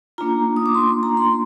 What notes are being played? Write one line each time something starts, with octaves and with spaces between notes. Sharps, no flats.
A#3 D4 F4 A#5
D#6
D6
C6
A#5
C6